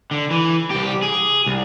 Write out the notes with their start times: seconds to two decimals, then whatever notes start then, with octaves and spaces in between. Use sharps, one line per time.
0.11 D3
0.31 E3
0.70 C2 G4
1.02 G#4
1.46 C2